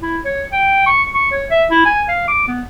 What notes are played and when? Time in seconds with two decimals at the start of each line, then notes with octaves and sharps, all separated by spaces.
0.03 E4
0.25 C#5
0.52 G5
0.86 C#6
1.14 C#6
1.31 C#5
1.50 E5
1.71 E4
1.86 G#5
2.09 F5
2.28 D6
2.48 B3